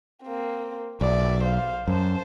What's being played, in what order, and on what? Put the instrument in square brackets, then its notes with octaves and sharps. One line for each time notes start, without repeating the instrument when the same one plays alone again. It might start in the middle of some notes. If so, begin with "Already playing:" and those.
[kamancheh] A#3 C4
[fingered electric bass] B1 [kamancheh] D5 E5
[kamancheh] C5 F5
[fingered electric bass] F#2 [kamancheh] C5 A5